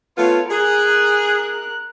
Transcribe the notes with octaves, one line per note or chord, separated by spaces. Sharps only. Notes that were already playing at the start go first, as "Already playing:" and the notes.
A3 B3 F4 C#5
G#4 A#4 F#6